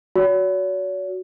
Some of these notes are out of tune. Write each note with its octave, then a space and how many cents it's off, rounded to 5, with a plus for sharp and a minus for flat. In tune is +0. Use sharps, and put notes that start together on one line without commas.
F#4 +0 C#5 +45